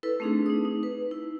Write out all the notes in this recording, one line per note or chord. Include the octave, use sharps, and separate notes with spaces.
E4 A4 B4
A3 C4 D4 D#4 G#4
D#4 D#6
D#4
B4
E4